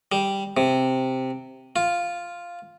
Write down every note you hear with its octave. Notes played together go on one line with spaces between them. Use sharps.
G3
C3
F4